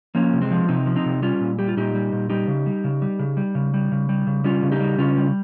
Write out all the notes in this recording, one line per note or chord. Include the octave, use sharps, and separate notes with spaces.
F3 A#3 C#4
C3
G#3 C4
F3
C3 C4 D#4
F3
C4 D#4
C3
G3 C#4 F4
A#2
G3 G4
F4
A#2 D#4 G4
G3
A#2
G3 D#4 G4
C#3
G3
C#3
G3
C#3
G3
C#3
G3
C#3
G3
C#3
G3 C#4 F4
C#3
D#4 G4
G3
C#3 C#4 F4
G3